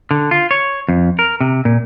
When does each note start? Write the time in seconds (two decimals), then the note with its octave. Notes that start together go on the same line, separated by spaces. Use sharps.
0.11 D3
0.31 F4
0.51 C#5
0.89 F2
1.19 A#4
1.41 C3
1.65 A#2